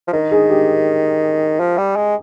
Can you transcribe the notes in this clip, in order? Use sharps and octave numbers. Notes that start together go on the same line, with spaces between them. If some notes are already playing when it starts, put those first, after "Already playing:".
F3
D#3 A#4
G#4
G4
F3
G3
G#3